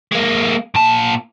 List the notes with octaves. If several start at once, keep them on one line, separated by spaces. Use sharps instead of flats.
G#3 A#3
A#2 A5